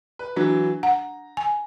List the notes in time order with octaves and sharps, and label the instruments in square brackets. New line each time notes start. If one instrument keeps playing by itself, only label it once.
[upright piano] B4
[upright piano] E3 F#3 [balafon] D4
[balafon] F#5 [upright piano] A#5
[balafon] G#5